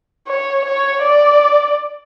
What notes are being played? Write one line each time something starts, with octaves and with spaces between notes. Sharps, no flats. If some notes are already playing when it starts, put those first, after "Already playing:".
C#5
C#5
D5